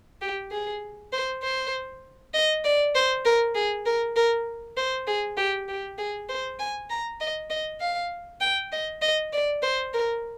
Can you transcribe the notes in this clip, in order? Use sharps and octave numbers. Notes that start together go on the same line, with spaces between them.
G4
G#4
C5
C5
D#5
D5
C5
A#4
G#4
A#4
A#4
C5
G#4
G4
G4
G#4
C5
G#5
A#5
D#5
D#5
F5
G5
D#5
D#5
D5
C5
A#4